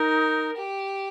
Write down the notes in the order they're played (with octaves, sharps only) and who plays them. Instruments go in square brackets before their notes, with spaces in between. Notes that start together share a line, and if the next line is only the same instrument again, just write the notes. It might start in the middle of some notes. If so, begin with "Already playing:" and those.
Already playing: [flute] D#4 [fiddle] A#4
[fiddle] G4